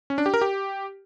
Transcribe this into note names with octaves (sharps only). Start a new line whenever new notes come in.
C#4
D4
G4
A#4
G4